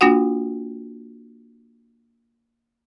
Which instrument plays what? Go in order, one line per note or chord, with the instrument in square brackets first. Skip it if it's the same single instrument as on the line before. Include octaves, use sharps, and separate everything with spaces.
[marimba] A#3 D4 F4 F#4 F#5